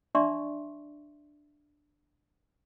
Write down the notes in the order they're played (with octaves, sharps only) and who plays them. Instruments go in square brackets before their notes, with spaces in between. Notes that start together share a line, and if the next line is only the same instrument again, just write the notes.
[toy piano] D4 D5 E5 A5 C6 C#6